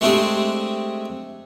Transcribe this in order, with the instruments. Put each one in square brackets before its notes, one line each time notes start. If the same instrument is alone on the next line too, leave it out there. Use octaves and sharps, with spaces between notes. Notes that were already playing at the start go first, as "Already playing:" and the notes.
[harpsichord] G#3 A3 C4 D4 G4 G#4